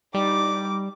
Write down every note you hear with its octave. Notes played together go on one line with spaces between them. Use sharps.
G3 D#4 D6